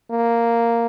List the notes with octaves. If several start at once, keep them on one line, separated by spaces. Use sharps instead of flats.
A#3